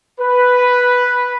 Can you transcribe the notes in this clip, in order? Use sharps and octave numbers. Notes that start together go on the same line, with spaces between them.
B4